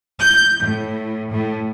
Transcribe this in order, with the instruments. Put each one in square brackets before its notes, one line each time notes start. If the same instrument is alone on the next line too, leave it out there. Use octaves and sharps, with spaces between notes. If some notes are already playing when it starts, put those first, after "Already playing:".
[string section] G6
A2
A2